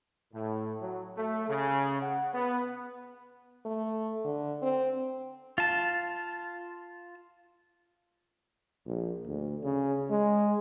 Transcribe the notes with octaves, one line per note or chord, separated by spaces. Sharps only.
A2
F#3
A3
C#3
F#5
B3
A3
D3
C4
F4 A5
A#1
D2
C#3
G#3